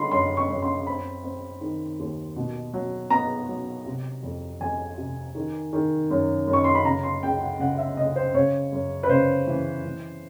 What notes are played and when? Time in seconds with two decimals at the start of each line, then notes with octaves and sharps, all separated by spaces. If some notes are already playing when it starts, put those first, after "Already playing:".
Already playing: D3 G3 B5 C6
0.11 F#2 C6
0.37 C#6
0.49 F#2
0.62 C6
0.87 C4 B5
1.24 C4
1.61 D#3
1.99 D#2
2.36 B2
2.74 F#3
3.10 B3 A#5
3.48 F#3
3.86 C3
4.23 F2
4.61 F2 G#5
4.98 C3
5.35 D#3
5.73 D#3
6.11 F#2
6.47 F#2
6.53 C#6
6.64 C6
6.75 B5
6.85 C#3 A#5
7.03 C6
7.23 C#2 G5
7.41 F#5
7.59 C#3 F#5
7.78 E5
7.97 C#3 D#5
8.16 C5
8.35 C#3 C#5
8.73 F#2
9.03 B4
9.09 C#3 C5
9.47 E3
9.85 E3